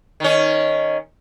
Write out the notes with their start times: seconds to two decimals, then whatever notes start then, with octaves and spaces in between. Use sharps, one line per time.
0.20 D#3 C#4